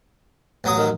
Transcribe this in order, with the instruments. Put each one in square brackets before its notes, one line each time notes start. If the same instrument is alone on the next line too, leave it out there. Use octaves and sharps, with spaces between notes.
[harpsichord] A1 F#3 D#6
[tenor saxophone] D#3